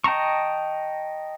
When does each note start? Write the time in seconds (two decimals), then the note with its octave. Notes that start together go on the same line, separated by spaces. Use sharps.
0.04 D#5 G5 A5 A#5 C#6